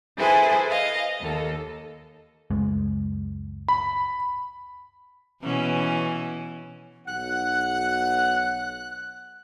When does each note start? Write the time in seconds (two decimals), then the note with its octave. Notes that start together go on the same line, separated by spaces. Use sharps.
0.18 E4 G#4 A4 B4 C5 G#5
0.71 D#5 F5
1.20 D#2 A4
2.51 C#2 F#2 G#3
3.68 B5
5.43 B2 E3 C#4
7.07 B1 F#5 F#6